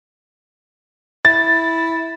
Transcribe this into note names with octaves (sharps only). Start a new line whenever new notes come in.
E4 A6